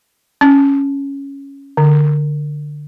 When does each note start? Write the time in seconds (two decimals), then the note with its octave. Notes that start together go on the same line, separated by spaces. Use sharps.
0.41 C#4
1.77 D3